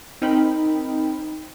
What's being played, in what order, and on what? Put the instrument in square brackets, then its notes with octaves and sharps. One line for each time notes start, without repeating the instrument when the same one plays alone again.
[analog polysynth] C4 D#4 A#4 G5 B5